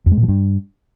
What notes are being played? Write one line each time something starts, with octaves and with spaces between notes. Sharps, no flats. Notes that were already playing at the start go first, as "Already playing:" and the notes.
F2
G#3
A#2
F3
G2